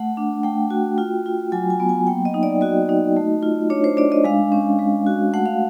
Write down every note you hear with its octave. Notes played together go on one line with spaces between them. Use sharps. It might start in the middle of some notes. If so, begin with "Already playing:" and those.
Already playing: A3 F#5
D4
A3 G5
F#4
F4
F4
F#3 G#5
G#5
B3
G#5
A#3 G5
D#5
D#4
D5
F#4 D#5
D#4
A3
F4
D4 C#5
C5
D4 D5
D#5
G#3 F5
C#4
G#3
F#4
A3 F#5
F5